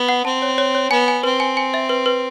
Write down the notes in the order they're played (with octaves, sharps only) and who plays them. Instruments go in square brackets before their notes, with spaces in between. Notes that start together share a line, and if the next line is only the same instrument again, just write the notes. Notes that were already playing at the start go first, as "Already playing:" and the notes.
Already playing: [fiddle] B3
[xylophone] F#5
[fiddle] C4 [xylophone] A5
[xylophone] C#5
C#5
C#5
[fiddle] B3 [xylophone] G#5
[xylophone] G#5
[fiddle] C4 [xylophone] B4
[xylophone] G#5
G#5
E5
B4
B4